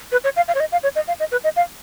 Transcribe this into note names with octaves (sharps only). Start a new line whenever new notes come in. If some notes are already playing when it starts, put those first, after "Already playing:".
B4
C#5
F5
F5
C#5
D#5
F5
C#5
D#5
F5
D#5
B4
D#5
F5